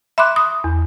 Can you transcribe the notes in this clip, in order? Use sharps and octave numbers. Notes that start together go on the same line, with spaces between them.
E5 B5 C6 D6 F#6
D#6
E2